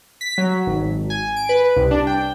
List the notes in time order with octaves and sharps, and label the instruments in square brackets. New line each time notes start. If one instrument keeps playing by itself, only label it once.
[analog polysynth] B6
F#3
G#1
G#5
D7
B4
C2
D4
G5